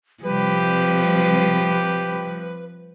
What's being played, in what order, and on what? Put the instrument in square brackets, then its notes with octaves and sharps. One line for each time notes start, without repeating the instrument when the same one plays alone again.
[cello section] C3 G3 [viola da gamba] F3 [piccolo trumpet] G4 [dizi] B4